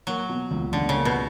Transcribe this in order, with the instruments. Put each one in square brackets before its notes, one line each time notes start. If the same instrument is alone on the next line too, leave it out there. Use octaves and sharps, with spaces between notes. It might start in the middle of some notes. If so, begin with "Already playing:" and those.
[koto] F#3 [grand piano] A#3
[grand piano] B2
C#2
[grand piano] C#2 [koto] D3
[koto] C#3
[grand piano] A#3
[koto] B2